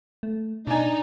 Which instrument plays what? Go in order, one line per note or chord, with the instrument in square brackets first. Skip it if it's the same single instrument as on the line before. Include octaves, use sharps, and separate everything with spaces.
[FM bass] A3
[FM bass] B2 [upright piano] D4 G#5 [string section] D#4